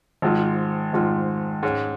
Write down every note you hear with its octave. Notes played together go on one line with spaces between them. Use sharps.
G#1 G#2 F3
G#1 G#2 F3
G#2 G#3 C#4